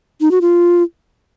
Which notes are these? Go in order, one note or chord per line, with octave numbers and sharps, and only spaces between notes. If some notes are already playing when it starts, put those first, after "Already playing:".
D#4
F#4
F4